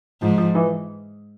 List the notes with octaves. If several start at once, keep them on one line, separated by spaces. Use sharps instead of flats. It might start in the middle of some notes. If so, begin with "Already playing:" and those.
G#2 F3
F3
E3